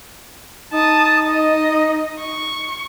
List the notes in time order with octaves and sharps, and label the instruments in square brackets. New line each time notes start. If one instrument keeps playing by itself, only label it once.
[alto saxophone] D#4 [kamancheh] A5 D#6
[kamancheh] D#5
C#6